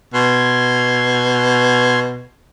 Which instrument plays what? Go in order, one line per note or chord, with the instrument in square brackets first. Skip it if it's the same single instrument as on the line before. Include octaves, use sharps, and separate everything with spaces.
[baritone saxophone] B2 [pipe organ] C6 G#6